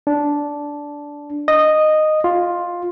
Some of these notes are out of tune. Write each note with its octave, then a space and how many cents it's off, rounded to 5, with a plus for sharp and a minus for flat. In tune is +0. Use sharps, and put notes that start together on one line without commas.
D4 -10
D#5 -10
F4 +10